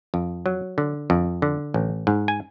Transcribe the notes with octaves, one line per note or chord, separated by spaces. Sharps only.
F2
F#3
D3
F2
D3
A1
G#2
G#5